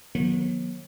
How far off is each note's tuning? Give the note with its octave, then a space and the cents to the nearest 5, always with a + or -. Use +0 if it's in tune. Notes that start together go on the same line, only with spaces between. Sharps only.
D#3 +0 F#3 -35 B3 -45